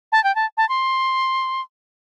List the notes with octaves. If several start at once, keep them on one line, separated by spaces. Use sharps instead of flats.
A5
G5
A5
A5
C6